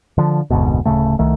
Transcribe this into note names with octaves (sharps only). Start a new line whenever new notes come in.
D3 F3
F1 D2 G#2 B2
D1 B1 C#3 A3
C2 D#3 A3